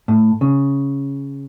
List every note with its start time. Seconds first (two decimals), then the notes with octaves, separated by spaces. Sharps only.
0.08 A2
0.41 C#3